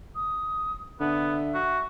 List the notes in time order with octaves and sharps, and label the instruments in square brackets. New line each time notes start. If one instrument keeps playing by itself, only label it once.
[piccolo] D#6
[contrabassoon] D3 [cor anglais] B3 [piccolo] E5
[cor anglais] F#4